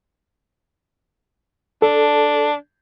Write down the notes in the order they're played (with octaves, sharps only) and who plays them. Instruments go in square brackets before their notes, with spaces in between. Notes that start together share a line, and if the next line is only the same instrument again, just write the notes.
[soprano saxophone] D4 [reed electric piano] A4